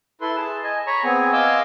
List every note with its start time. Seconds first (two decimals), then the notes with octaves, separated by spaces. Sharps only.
0.21 E4 A4 B4 C6
0.36 G#4 A5
0.64 D#5 G#5
0.87 C#5 A#5 B5 C#6
1.04 B3 C4 G#4 G#5
1.33 D#5 F5 G#5 C6 D6 E6